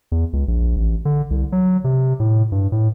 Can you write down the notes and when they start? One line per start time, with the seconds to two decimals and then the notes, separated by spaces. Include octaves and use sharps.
0.12 E2
0.33 C#2
0.48 A#1
0.76 A1
1.05 D3
1.31 C2
1.52 F#3
1.84 C3
2.20 A2
2.52 G2
2.72 A2